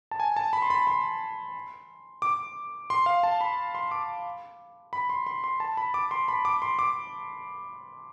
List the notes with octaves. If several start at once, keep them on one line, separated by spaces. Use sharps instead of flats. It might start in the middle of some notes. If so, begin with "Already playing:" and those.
A5
G#5
A5
B5
C6
B5
C6
D6
C6
F5
A5
B5
C6
D6
B5
C6
C6
C6
A5
B5
D6
C6
B5
D6
C6
D6